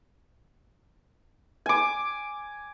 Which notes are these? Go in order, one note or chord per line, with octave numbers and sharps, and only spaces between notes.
G#5 D6